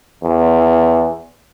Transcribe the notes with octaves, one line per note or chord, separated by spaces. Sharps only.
E2